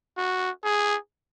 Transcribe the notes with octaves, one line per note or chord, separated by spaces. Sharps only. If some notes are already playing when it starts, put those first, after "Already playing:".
F#4
G#4